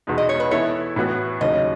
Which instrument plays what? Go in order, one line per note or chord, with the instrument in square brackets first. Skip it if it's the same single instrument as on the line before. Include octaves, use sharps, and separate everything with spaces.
[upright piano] E2 B2 G#3 D#4
[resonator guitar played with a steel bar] D#5
C#5
B4
[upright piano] E3 B3 E4 A4 [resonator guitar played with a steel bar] C#5
[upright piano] A2 E3 B3 F#4
[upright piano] D#2 C#3 F#3 C#4 [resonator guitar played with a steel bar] D#5